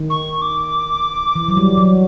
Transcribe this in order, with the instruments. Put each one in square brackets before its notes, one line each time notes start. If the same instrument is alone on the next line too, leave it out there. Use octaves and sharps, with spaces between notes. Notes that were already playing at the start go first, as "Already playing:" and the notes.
Already playing: [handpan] D#3
[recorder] C#6
D6
[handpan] E3
F#3
G3
F#3